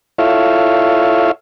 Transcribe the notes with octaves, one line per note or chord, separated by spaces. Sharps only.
E4 F4 A4 C#5 E5 F5